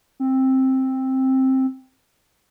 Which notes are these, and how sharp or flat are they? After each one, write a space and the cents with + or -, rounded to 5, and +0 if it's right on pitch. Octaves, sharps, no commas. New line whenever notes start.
C4 +10